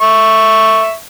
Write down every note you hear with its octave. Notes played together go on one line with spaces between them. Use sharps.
E5 C#6